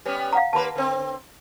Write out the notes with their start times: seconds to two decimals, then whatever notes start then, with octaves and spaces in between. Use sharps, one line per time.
0.05 G3 B3 C#4
0.33 F5 F#5 A#5
0.53 D#2 A#3 B4 A5 B5
0.75 D3 C4